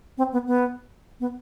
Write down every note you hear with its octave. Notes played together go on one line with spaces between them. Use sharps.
C4
B3
B3
B3